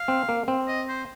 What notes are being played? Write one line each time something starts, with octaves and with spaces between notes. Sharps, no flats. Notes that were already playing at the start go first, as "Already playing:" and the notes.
Already playing: F5
C4
A#3
C4
D#5
C5